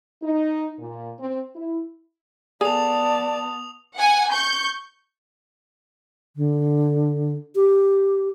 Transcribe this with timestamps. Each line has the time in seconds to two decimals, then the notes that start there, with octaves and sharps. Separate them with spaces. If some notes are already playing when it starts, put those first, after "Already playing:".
0.22 D#4
0.78 A#2
1.18 C4
1.55 E4
2.61 B3 G#4 A4 D5 G#5 A5 D#6 F7
3.96 F#5 G#5
4.32 C#6 G6
6.36 D3
7.55 G4